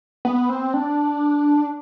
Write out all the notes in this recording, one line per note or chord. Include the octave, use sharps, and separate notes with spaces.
B3
C4
D4